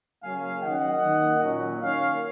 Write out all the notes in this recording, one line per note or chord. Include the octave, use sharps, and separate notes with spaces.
C#3 F#3 A#3 C#4 F5 G#5
D#3 F#3 C#4 D#5 F#5
D#3 A#3 D#4
A#2 F#3 C#4
D#3 A#3 C#4 C#5 F5